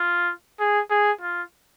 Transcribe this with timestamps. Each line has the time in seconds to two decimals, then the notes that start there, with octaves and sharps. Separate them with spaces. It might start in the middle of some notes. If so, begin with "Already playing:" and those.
Already playing: F4
0.60 G#4
0.90 G#4
1.21 F4